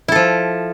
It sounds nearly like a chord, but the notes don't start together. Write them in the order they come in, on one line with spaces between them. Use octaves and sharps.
E4 A4 F3